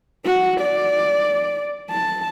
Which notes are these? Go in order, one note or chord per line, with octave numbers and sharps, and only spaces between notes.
F#4
D5
A5